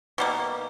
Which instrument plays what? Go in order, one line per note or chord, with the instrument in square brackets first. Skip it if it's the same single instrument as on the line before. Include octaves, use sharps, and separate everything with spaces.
[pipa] B2 G3 A#3